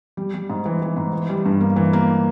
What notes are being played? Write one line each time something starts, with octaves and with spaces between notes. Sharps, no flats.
G3
G3
G#2
E3
E3
G#2
E3
G3
G2
A#3
E3
A#3